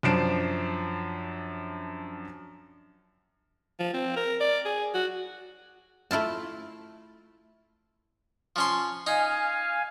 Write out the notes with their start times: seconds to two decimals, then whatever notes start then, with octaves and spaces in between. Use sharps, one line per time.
0.03 F#2 F3 D4 C7 D7 E7
3.80 F3
3.94 C4
4.17 A#4
4.41 D5
4.65 G#4
4.94 F#4
6.11 A3 E4 F4 A5
8.56 F3 C#4 C6
9.07 D#4 F5 G#5